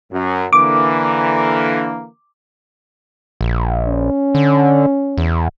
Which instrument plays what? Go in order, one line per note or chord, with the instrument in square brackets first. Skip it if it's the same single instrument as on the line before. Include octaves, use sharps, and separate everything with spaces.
[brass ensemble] F#2
[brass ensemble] D3 E3 A#3 [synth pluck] D6
[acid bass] A#1
[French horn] C#4
[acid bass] D3
E2